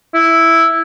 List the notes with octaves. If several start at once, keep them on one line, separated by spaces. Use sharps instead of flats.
E4